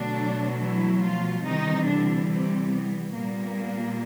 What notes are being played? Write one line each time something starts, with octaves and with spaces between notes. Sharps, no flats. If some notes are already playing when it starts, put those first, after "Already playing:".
Already playing: B2 D3 F#3 A3 D4
E3 E4
F3 F4
C3 D#3 E3 G3 D#4
D3 D4
C3 C4
B3
A#2 G3 A#3 B3